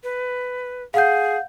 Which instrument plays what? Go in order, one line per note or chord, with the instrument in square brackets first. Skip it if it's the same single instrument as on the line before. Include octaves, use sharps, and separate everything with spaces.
[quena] B4
[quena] G#4 [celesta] F5 F#5 G6